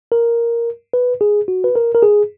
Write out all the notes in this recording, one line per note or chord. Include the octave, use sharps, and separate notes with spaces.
A#4
B4
G#4
F#4
B4
A#4
A#4
G#4